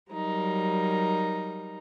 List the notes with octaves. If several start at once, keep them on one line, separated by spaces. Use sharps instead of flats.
F#3 G3 D#4 A#4